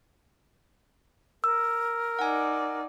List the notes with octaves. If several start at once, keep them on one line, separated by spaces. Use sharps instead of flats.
A#4 E6
D#4 D5 F#5 G#5